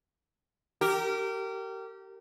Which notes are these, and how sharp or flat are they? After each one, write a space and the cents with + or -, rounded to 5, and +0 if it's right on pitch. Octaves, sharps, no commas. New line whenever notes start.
G4 -25 A#4 -25